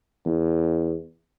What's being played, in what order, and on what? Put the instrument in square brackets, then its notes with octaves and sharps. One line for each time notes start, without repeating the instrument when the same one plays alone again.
[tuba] E2